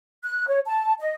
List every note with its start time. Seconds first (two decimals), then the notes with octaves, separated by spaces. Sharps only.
0.23 F#6
0.48 C#5
0.66 A5
0.99 D#5